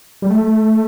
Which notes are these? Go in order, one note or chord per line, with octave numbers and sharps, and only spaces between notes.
G3
A3